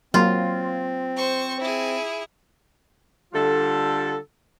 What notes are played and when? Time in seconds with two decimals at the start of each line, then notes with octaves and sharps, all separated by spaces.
0.14 F#3 A#3 C4 F4
1.17 C5 C#6
1.60 E4 G#4
3.33 D3 G3 F4 A4